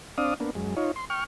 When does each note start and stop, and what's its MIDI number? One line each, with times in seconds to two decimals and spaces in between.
0.18 0.34 60
0.18 0.34 62
0.18 0.34 74
0.18 0.34 77
0.18 0.34 87
0.40 0.51 58
0.40 0.51 59
0.40 0.51 62
0.55 0.75 42
0.55 0.75 56
0.77 0.91 63
0.77 0.91 65
0.77 0.91 73
0.96 1.05 84
1.10 1.24 79
1.10 1.24 85
1.10 1.24 89